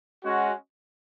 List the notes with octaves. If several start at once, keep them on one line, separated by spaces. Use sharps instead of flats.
G#3 C#4 F#4